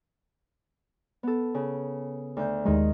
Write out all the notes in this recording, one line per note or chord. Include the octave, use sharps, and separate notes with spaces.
B3 A4
C#3
D2 G6
D#2 D#3 G#3